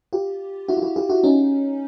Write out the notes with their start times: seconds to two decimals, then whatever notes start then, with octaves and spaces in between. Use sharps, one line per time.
0.13 F4 G4
0.68 E4 F#4
0.77 F4
0.82 E4 F#4
0.96 F4 G4
1.09 E4 F#4
1.23 C#4 D#4